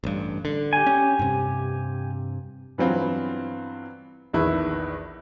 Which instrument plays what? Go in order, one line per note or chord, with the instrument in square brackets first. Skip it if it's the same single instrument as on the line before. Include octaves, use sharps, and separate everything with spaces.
[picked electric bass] A1 G2
D3
[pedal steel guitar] G4 G#5
[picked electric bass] C#4
G2 C3
[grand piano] G2 E3 F#3 B3 C4 F4
A#1 E2 D#3 E4 B4